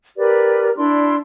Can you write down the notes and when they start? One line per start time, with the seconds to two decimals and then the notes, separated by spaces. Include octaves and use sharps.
0.17 G4 A#4 B4 D5
0.76 D4 E4 D5 C6